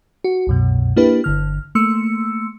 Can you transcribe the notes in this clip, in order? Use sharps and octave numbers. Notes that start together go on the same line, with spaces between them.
F#4
C2 F#2 B2
A#3 D4 E4 G4 B4
G1 D3 F6
A3 A#3 C6 E6 C#7